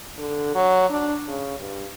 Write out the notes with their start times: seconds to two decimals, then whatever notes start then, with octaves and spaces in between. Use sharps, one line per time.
0.18 D3
0.55 F#3
0.90 D4
1.28 C#3
1.59 G2